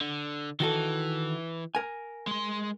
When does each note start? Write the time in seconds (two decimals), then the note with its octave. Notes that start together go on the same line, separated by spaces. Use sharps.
0.01 D3
0.60 D#3 E3 F#4 A4
1.75 A#4 G#5
2.27 G#3 C6